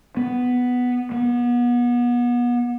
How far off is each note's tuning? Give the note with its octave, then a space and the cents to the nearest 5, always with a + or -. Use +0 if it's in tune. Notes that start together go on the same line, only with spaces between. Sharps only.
B3 +5
B3 -30